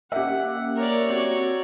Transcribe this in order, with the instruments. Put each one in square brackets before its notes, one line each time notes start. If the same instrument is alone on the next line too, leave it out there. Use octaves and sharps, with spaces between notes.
[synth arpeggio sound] A#3 C#4 [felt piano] G4 E5 [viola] F#5
[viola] A#4 D5 [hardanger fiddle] C#5
[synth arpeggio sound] C4 [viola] F#4 D5